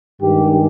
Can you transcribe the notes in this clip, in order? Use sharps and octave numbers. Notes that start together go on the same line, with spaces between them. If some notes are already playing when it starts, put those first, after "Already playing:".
G2 D#3 G#3 G4